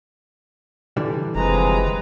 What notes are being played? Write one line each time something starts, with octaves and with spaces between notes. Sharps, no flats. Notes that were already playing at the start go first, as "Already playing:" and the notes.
D3 E3 G3
F#1 C3 F3 G#3 B4 A#5